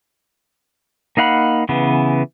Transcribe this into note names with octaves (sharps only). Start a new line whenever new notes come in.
A#3 D#4 F5 F#5 B5
C#3 E3 B3